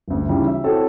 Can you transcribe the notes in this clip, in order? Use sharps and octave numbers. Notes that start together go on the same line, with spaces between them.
G1 D2
C#3 E3 G3 D#4 F4
E5
C4 E4 F#4 A4 C#5